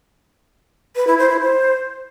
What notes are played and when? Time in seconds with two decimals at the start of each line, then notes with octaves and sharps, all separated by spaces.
0.96 B4
1.07 E4
1.18 C5
1.30 E4
1.41 C5